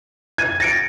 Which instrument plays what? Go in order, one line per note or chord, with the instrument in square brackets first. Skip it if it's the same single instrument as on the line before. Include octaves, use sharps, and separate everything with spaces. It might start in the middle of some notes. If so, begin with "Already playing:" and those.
[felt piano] G#6 D#7
[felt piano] A6 C#7 D7 [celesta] A#6